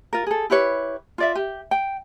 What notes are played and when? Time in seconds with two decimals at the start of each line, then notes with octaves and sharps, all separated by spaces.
0.13 F4 A#4
0.27 G#4 A4
0.50 E4 G4 B4 C#5
1.18 F4 D5 E5
1.35 G4
1.71 G5